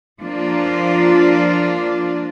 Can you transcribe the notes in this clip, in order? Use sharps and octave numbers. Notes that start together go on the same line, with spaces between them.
F3 A#3 D4 F4